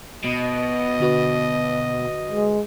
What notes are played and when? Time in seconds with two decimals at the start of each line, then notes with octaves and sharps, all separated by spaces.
0.25 B2 D#5
1.00 D3 F#4 B4
2.32 G#3